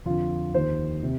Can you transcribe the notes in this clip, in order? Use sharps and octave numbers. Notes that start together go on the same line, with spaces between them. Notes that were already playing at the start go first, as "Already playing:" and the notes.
F2 D3 F4
D#2 D#3 C5
C3